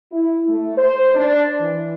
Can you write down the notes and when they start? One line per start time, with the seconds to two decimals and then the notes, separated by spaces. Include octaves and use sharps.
0.12 E4
0.48 A3
0.77 C5
1.15 D4
1.60 E3